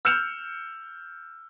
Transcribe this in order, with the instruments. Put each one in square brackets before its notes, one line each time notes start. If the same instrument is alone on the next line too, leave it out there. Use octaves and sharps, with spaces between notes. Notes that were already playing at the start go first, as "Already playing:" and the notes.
[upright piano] E6 F6 G6 C#7 E7 F7